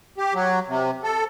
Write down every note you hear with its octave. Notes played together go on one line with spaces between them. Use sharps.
G4
F#3
C3
A4